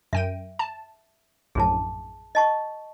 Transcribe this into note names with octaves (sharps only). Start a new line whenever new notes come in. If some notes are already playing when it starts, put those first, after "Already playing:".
F#2 E5 G5 D#7
A5
A#1 F#2 A2 G#4 A5
D#5 A5 C#6